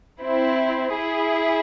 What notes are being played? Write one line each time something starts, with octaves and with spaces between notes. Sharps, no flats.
C4 E4
E4 G#4